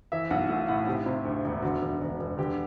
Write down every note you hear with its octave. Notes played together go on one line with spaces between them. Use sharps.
E3 E5
B1 F#5
A3 F#5
A2 F#5
C3 G4
C3
D2
E1
D3 F#4
E1
E1
E1
D3 G4